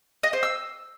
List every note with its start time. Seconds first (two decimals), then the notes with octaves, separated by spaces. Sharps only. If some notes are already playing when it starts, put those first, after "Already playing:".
0.23 D#5
0.33 C5
0.43 E6